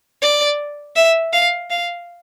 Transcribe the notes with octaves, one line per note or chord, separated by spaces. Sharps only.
D5
E5
F5
F5